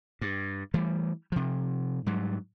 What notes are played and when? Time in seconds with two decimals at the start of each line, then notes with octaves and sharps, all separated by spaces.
0.21 G2
0.74 E3 G3 A3
1.32 C3 F3
2.06 G#2 F#3 G3